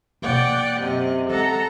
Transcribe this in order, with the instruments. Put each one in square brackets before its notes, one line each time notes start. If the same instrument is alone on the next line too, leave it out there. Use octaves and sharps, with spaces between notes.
[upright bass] B2 A#3 [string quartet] D5 F#5 G5
[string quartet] F#2 C3 D#5
[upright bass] G#3 [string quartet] A4 F#5 A#5